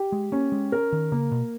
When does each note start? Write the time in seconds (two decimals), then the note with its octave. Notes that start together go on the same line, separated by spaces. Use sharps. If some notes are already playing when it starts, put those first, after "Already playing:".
Already playing: G4
0.12 G#3
0.32 A#3 C#4
0.52 G#3
0.72 A#4
0.92 D#3
1.12 C#3 A#3
1.32 B2